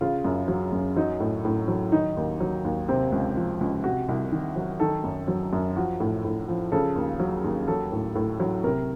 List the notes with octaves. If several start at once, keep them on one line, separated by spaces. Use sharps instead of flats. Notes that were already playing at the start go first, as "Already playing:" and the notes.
C#3 F4
F#2
F#3
F#2
F#3 D#4
A2
A2
F#3
D#3 D#4
D#2
F#3
D#2
C3 C4
C#2
F3
C#2
C3 F#4
C2
D#3
F#3
D#3 A4
F#2
F#3
F#2
F3 F#4
A2
A2
F3
C#3 A4
D#2
F#3
D#2
F#3 A4
A2
A2
F#3
C3 A#4